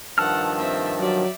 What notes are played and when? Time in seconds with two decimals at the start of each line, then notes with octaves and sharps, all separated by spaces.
0.18 G2 D#3 F3 F#5 A5 E6 F6
0.58 C4 E5
1.00 F#3 D5 E5